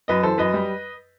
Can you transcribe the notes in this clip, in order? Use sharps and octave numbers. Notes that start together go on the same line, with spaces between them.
F#2 B4 D#5
E3 A4 C5
F#2 B4 D#5
G3